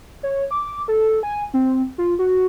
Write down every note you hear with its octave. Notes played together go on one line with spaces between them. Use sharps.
C#5
D6
A4
G#5
C4
F4
F#4